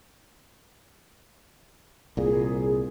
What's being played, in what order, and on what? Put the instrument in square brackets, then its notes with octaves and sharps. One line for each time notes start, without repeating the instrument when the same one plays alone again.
[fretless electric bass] C2 A#2 [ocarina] G#4